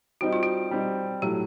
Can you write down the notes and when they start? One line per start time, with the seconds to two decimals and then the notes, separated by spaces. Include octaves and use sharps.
0.21 G3 C4 D#4 F#4
0.33 F4
0.43 F#4
0.71 G3 C4 D#4
1.22 A2 F#3 A3 G4